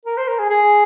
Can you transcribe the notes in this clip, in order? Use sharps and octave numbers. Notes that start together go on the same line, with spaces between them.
A#4
C5
A#4
G#4
G#4